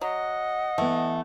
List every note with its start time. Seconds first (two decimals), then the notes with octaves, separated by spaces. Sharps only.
0.01 F#3 D#5 F#5
0.78 E3 A3 B3